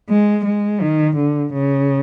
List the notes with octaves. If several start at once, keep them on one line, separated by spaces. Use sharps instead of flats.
G#3
G#3
D#3
D3
C#3